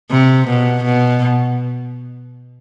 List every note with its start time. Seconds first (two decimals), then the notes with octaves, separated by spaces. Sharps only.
0.11 C3
0.48 B2
0.84 B2